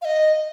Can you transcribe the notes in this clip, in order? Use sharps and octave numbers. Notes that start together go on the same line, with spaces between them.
F5
D#5